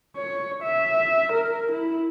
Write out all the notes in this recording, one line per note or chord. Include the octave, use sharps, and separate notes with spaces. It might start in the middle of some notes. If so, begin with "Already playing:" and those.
C#5
E5
A#4
E4